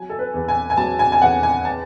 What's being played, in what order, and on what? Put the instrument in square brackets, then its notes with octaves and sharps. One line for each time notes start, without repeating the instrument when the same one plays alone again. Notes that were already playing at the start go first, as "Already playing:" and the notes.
Already playing: [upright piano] F#3 G#5
A4
B4
E2
G#5
G#5
F#3 A5
G#5
G#5
E2 F#5
G#5
A5